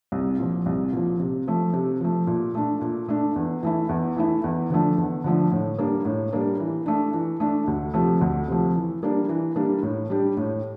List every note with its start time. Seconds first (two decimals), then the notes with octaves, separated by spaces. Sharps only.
0.12 C2
0.39 A#2 F3
0.66 C2
0.93 A#2 F3
1.20 C3
1.47 F3 A3
1.73 C3
2.01 F3 A3
2.27 A#2
2.55 A3 D4
2.81 A#2
3.09 A3 D4
3.36 E2
3.63 E3 A3 E4
3.89 E2
4.16 E3 A3 E4
4.44 E2
4.70 D3 F3 A3 D4
4.98 E2
5.24 D3 F3 A3 D4
5.52 A2
5.79 G3 A#3 D4
6.05 A2
6.32 G3 A#3 D4
6.60 E3
6.86 A3 D4
7.14 E3
7.40 A3 D4
7.67 D2
7.94 C3 F3 A3
8.21 D2
8.48 C3 F3 A3
8.76 E3
9.03 G3 A#3 D4
9.29 E3
9.56 G3 A#3 D4
9.83 A2
10.10 G3 D4 G4
10.37 A2